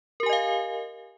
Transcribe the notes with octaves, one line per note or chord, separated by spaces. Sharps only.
G4 A#4 D#5 F5 G#5